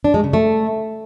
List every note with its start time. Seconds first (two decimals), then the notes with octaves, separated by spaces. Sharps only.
0.04 D4
0.14 G#3
0.24 C#3
0.33 A3